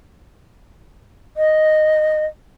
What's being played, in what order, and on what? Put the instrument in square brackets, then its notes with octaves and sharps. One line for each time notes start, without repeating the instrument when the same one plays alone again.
[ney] D#5